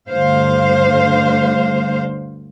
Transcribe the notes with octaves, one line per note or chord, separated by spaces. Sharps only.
D2 G2 D3 C5 F5